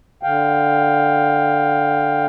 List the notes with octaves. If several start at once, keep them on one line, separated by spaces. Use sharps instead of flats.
D3 F5 G5